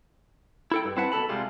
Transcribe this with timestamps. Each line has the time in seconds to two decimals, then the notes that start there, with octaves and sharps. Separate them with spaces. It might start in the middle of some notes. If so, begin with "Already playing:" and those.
0.72 E4 A4 G5
0.85 G2
0.97 C4 E4 B4 F#5 A5
1.12 C2 B2 F#4 A4 A5 B5
1.29 C3 G3 G#3 F4